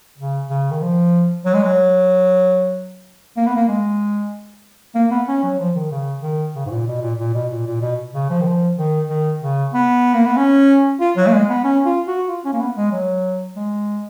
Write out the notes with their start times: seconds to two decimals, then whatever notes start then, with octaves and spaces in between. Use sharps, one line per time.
0.18 C#3
0.49 C#3
0.71 D#3
0.82 F3
1.45 F#3
1.54 G#3
1.63 F#3
3.37 A#3
3.47 B3
3.56 A#3
3.68 G#3
4.95 A#3
5.11 B3
5.28 C#4
5.43 F#3
5.59 F3
5.75 D#3
5.92 C#3
6.23 D#3
6.55 C#3
6.66 G#2
6.71 A#2
6.87 B2
7.02 A#2
7.19 A#2
7.34 B2
7.51 A#2
7.66 A#2
7.82 B2
8.14 C#3
8.30 F3
8.41 D#3
8.46 F3
8.78 D#3
9.09 D#3
9.42 C#3
9.74 B3
10.14 A#3
10.26 B3
10.37 C#4
11.00 F4
11.17 F#3
11.27 A#3
11.33 G#3
11.49 B3
11.64 C#4
11.85 F4
12.07 F#4
12.28 F4
12.45 C#4
12.53 A#3
12.60 B3
12.76 G#3
12.92 F#3
13.56 G#3